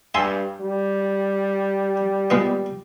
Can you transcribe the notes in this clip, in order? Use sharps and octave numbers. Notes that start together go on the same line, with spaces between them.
G2 E5 G#5 C6
G3
A#2 G#3 B3